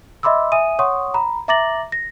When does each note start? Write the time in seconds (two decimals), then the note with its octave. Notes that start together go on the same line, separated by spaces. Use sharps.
0.23 D#5 E5 B5 C6 D6 E6
0.52 E5 G#5 D#6 D#7
0.79 C#5 F#5 C6 C#6 D#6
1.14 A#5 B5
1.48 E5 A#5 D6 A6 A#6 F#7
1.92 A#6